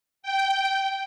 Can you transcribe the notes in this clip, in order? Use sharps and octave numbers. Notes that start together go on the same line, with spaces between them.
G5